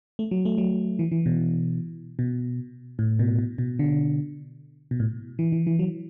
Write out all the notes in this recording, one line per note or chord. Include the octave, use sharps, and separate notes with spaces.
A3
F#3
A3
F#3
E3
E3
B2
B2
A2
B2
B2
B2
D3
B2
A2
E3
E3
E3
F#3